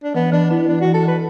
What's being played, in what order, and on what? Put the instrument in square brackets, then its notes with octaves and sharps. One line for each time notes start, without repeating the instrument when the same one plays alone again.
[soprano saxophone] D4
[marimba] E3 [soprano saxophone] B3
[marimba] E3 [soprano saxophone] D4
[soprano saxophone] B3 [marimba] E4
[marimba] E3 [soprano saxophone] D4
[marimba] E3 [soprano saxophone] F#4
[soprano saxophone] A4
[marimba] E3 [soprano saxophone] B4